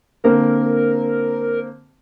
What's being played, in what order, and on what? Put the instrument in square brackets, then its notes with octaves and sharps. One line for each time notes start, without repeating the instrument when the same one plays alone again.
[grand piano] D3 A#3 C4 [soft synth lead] A#4